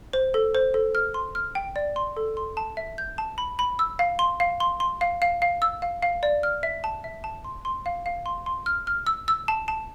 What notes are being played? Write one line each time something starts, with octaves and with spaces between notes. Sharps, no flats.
C5
A4
C5
A4
F6
C6
F6
G5
D5
C6
A4
C6
A5
E5
G6
A5
B5
B5
E6
F5
C6
F5
C6
C6
F5
F5
F5
E6
F5
F5
D5
F6
E5
A5
E5
A5
C6
C6
F5
F5
C6
C6
F6
F6
E6
E6
A5
A5